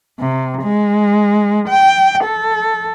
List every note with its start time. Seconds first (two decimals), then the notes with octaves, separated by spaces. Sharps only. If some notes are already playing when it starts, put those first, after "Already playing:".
0.20 C3
0.63 G#3
1.69 G5
2.24 A4